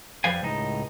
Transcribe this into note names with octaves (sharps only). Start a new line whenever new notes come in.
F2 F3 G3 B4 F5 G#5
C#2 A2 D#4